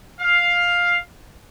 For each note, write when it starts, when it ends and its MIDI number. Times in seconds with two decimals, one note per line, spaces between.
0.20 0.99 77